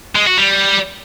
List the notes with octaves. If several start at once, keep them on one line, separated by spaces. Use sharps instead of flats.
G#3
F#4
G3